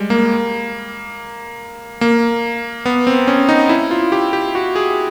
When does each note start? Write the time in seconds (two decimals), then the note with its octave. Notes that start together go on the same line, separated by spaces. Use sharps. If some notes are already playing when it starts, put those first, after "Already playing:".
Already playing: G3 G#3
0.10 A#3
2.01 A#3
2.86 B3
3.07 C4
3.28 C#4
3.49 D#4
3.69 E4
3.91 F4
4.12 G4
4.33 G4
4.55 F#4
4.76 G#4